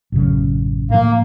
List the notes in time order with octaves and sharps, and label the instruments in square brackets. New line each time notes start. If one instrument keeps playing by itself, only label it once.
[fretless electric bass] A1 F#2 C#3
[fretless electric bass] A2 F3 [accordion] A#3